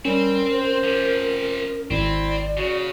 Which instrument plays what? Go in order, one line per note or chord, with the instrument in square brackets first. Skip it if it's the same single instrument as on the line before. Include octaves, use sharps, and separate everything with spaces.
[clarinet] G3 [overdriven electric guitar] C4 [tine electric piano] C#4 [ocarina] A#4
[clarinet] C5
[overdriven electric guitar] C3 F3
[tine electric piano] G#1 [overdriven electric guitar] C4 [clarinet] E4 [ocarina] D5
[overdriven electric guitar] C#3 [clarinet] F#4